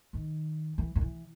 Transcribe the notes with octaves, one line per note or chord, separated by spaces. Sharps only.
D#3
E3
D#3
E3